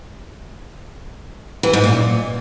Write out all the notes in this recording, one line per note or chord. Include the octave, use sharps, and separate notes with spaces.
E3
G#2
A#2